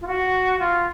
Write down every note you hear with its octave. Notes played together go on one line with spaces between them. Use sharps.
F4
F#4
F4